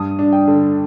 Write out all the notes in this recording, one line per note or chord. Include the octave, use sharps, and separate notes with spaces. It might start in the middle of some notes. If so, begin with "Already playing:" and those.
Already playing: G2 D#6
D4
G5
D3